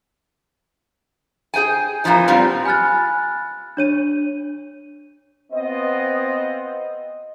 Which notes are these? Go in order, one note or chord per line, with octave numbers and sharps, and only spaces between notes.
G#4 C5 G5 G#5
F2 A#2 E3 F3 D#4
A#2 G3 B3 C4 F4
G#5 B5 F6 F#6 A6
D4 C#5 D#7
B3 C4 F4 D#5